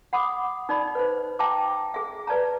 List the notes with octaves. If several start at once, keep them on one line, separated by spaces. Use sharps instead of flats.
F#5 B5 D6 D#6
D#4 D5 B5
B4 C5
E5 G5 A5 A#5 D6
G#4 E5
B4 D5 A5 A#5